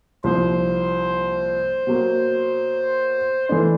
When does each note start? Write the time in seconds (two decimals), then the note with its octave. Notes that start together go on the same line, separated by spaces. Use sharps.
0.24 C2 A#2 F3 C5
1.87 B2 F#3 A#3
3.49 E3 A3 D4